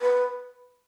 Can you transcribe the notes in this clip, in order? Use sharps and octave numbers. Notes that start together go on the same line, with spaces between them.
B4